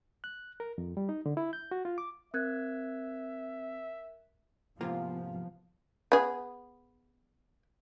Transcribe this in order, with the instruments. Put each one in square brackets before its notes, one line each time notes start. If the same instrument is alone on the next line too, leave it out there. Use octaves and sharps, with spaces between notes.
[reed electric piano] F#6
A#4
F2
G3
D#4
D3
E4
G6
F#4
F4
D6
[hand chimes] C4 [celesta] A#4 F#6 G#6 [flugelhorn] E5
[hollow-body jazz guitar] G#2 C3 A#3 [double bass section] F3 B3 [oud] F4
[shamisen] B3 G#4